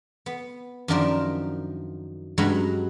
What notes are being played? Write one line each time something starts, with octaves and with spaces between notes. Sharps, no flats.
B3
F#2 D#3 F3 D4 A#4 C5
G2 F#3 G#3 C#4 A#5 B5